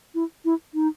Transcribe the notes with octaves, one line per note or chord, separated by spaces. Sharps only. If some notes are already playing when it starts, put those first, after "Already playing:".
E4
E4
D#4